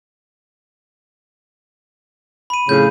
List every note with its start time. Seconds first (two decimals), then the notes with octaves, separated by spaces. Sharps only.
2.50 B5 D#7
2.69 F2 A2 C#3 G6